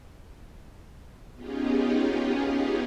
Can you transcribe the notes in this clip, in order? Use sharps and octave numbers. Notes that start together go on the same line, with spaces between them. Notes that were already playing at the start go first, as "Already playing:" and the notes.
B3 C#4 D#4 F4 G4 G#4